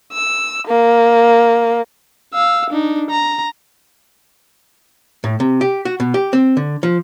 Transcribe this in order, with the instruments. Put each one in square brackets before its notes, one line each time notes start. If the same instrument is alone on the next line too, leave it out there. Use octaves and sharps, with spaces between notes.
[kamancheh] E6
A#3
[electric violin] F5 E6
D4 D#4
A#5
[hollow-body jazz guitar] A2
C3
G4
F#4
B2
G4
C4
D3
F3